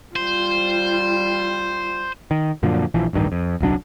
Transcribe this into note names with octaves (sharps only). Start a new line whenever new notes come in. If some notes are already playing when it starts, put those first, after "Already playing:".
G3 F4 C5
D#3
F#2 A#2 D3 F3
A#1 E3 F3
D1 A1 G2 D#3
F2
D#1 C2 F#3 D4